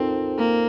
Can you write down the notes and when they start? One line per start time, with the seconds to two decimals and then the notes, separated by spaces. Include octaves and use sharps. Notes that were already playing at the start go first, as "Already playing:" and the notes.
Already playing: C4 D#4 F4 A4 A#4 C5
0.39 A#3